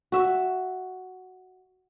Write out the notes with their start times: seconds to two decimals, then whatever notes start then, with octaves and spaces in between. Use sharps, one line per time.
0.12 F#4 E5